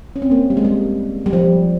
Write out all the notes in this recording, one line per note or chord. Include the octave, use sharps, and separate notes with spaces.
C#4
C4
A#3
G3
G#3
G3
G3
F3